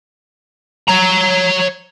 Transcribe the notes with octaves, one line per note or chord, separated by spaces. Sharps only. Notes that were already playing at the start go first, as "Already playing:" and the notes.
C#5 A#5